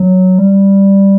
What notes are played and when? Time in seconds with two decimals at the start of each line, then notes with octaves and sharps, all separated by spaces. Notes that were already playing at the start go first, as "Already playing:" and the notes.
Already playing: F#3
0.39 G3